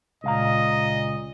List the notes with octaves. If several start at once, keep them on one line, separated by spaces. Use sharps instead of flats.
C#2 A#2 D#5 F5 A#5